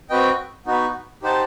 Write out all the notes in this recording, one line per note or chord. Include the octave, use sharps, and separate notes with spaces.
C4 F#4 B4 D#5 G5
B3 D#4 F#4 B4
D#4 G4 C5 F#5 A5